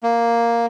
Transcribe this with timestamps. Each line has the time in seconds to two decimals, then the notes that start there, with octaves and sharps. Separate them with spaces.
0.03 A#3